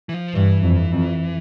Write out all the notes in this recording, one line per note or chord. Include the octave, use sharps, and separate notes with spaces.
E3
F3
G2 E3
F2
F2